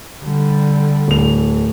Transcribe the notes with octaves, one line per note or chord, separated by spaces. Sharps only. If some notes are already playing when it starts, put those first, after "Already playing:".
D3 G3
D1 F7